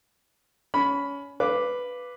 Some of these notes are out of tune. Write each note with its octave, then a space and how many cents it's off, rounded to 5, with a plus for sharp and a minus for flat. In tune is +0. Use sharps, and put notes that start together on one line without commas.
C#4 +25 B5 +0
B4 +0 F5 +0 D6 +0